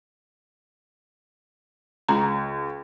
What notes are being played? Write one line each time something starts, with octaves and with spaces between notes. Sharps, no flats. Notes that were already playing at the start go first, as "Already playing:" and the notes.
C#2 A#5